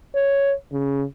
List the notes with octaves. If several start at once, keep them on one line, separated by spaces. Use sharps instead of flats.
C#5
C#3